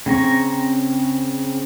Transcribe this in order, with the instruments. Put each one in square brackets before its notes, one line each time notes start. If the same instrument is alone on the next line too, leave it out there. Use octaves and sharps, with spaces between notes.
[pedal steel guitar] C#3 C4 A#5 C#6